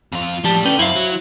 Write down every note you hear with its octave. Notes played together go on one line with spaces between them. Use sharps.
F2 F4
A2 F3 G3 G4 A5
C#4 A4 B4 D5 G5
F#2 E4 C5 F5
F#3